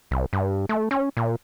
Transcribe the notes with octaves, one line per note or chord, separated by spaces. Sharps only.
C2
G2
A3
C#4
A#2